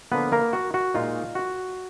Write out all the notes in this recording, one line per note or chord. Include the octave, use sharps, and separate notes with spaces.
D3 F3 A#3 B3 F4 B4
A#3 A#4
F#4
F#4
A#2 G#3 D#4 F4
F#4